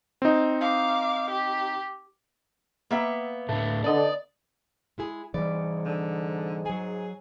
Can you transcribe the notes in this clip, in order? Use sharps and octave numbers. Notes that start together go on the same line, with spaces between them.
C4 D#4
F5 D6
G4
A#3 B3 E5
A2 D3 A3
D3 D4 D5 D#5
G#3 E4 G#4
G#2 E3 G3 D5
D3
F#3 G#4 G#5